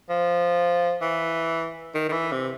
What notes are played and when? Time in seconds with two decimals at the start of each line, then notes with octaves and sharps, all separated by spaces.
0.09 F3
1.01 E3
1.94 D#3
2.09 D#3
2.12 E3
2.32 C3